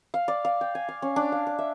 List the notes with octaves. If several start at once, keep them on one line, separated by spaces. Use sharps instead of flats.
F5
D5
F5
G5
G#5
F5
C#4
D4
F5
D6
E5